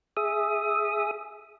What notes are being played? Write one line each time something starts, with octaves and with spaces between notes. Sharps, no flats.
G#4 E5 D#6